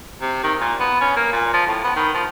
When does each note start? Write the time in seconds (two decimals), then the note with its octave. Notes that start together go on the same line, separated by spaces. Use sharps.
0.21 C3
0.43 D#3
0.61 A#2
0.80 B3
1.01 C#4
1.16 A#3
1.32 A#2
1.53 F3
1.67 A2
1.84 B3
1.96 D#3
2.14 F3